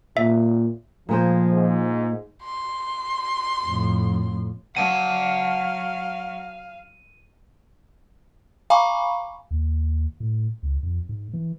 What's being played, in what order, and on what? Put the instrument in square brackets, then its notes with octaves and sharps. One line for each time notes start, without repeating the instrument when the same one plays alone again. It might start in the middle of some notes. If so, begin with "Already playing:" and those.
[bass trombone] A#2 [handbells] E5
[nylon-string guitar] A#2 G#3 C5 [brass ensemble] F3
[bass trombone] G#2
[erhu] C6
[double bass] F2 A2
[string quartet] F#3 [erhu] F5 [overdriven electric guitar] F#5 A5 [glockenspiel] D#7
[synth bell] F5 G#5 A#5 B5 C#6 D6
[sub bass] D#2
A2
C#2
F2
G#2
E3